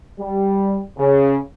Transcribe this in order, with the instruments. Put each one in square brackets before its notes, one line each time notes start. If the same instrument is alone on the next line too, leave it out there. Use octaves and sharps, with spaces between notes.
[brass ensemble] G3
C#3